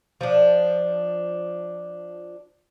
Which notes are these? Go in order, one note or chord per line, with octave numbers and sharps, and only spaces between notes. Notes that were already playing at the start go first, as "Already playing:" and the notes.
F3 D4